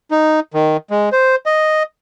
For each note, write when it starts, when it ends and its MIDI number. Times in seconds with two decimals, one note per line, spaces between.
0.11 0.40 63
0.54 0.77 51
0.90 1.09 56
1.12 1.36 72
1.46 1.83 75